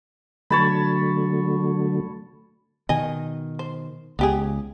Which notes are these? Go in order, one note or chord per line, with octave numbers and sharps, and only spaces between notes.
D3 F#3 A3 C#5 A5 B5
B2 D#3 D#5 G#5
C5
C#2 B3 G4 G#4